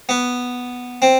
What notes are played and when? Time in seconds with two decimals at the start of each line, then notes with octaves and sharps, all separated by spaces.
0.09 B3
1.02 C4